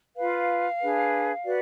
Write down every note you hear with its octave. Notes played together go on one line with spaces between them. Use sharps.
F4 B4 F5
D4 G#4 B4
F#4 B4 D5